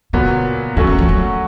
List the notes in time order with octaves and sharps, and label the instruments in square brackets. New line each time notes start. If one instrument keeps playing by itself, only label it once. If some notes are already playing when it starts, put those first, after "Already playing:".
[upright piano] A#2 F#3 B3 [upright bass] C#3
[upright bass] D3 [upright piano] F#3 A3 C#4 F#4
[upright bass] D#3
F3
F#3